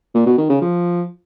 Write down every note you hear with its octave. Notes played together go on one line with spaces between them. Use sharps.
A#2
B2
D#3
C#3
F3